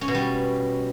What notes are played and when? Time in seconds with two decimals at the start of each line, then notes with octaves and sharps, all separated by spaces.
0.01 C#4
0.08 B2
0.15 G3